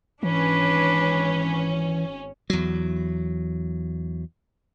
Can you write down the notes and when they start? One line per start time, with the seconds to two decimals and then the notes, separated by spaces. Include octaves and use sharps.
0.23 G#1 E3 C#4 D4 B4
2.50 E2 F#3